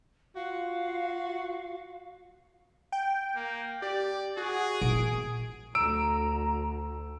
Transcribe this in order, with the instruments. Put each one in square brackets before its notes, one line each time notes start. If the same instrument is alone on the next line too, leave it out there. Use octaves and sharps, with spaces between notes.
[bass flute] F4 [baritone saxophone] F#4 [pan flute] F5
[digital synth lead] G5
[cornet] A#3
[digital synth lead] G4 [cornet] D5
[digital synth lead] F#4 [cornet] G#4
[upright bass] A#1 [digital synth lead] D7
[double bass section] D2 [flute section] A#5 [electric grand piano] E6 D7